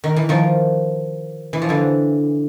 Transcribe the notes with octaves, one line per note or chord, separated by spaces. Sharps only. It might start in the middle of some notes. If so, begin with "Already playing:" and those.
D#3
E3
D#3 F3
E3
F3
D3 E3